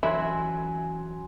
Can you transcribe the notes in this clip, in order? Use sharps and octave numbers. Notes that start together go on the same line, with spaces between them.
E3 F#3 C#4 E4 F#4 G#5 C6